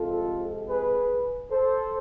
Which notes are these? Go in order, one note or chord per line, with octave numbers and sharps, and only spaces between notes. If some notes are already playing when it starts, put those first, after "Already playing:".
Already playing: F2 C3 G#3 C4 F4 A4
G#4 B4
A4 C5